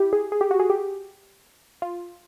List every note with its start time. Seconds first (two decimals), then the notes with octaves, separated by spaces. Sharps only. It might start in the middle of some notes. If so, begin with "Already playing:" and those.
Already playing: E4 G4
0.13 G#4
0.32 G#4
0.41 G4
0.51 F#4
0.60 G#4
0.70 G4
1.82 F4